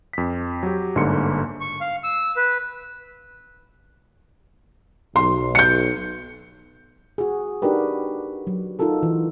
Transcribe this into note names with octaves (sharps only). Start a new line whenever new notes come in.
F2 B6
F#3 G4
G1 G#2 D3 A#3 C6 C#7
C#6
F5
E6
B4
B1 C6
G6 C#7
F#4 G#4
D4 D#4 F#4 G4 A#4 B4
F#3
D#4 F4 F#4 A4 A#4
E3